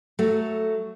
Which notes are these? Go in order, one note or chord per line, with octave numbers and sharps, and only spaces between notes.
F#3 A3